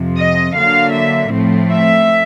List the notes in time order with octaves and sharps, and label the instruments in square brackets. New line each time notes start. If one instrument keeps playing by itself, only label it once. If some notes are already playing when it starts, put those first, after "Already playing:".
Already playing: [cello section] F2 C3 F3
D#5
D3 F#3 A#3 F5
E5
A2 F3 A3 C4
E5